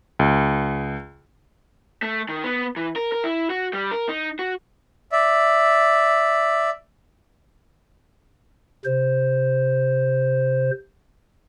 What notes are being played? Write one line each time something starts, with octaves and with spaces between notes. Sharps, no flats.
C#2
A3
D#3
B3
E3
A#4
A#4
E4
F#4
G3
A#4
D#4
F#4
D5 E5
C3 C5